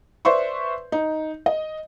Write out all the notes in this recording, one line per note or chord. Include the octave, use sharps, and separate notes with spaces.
B4 C5 D5 E5 C6 C#6
D#4
D#5